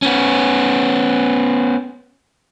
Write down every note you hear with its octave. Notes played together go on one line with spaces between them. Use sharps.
B3 C#4